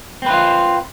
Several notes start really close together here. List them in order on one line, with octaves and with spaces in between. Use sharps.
C4 B4 F4